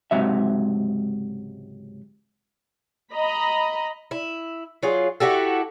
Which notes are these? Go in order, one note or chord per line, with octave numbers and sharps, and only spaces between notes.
C#2 G#2 C3 F#3 E5
D#5 A#5 B5
E4
F#3 F4 G#4
E4 F#4 G4 A4